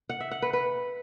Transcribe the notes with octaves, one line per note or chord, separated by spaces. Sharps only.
F#5
E5
F#5
B4
B4